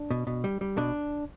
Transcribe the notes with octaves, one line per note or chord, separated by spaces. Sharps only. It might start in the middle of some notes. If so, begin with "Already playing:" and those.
Already playing: D4
B2
B2
G3
G3
B2 D4